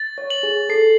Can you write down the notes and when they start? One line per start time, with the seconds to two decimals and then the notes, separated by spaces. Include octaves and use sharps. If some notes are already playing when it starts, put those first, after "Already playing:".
Already playing: A6
0.18 C#5
0.30 F#7
0.43 G#4
0.69 A4 C7